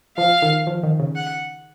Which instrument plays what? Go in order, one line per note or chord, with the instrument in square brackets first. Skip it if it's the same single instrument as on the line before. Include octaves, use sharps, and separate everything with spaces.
[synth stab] F3 [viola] F5
[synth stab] D#3
F3
D#3
C#3
[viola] F#5